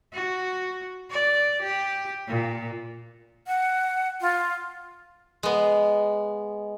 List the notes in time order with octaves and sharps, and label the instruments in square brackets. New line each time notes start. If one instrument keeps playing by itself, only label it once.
[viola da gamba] F#4
D5
G4
A#2
[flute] F#5
F4
[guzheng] G#3 B3